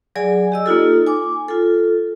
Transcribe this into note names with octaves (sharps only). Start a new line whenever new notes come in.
F#3 G#4 D5 G#5
G4 D#5 E6
A#3 D#4 F4 A4
G#5 D6
F4 A4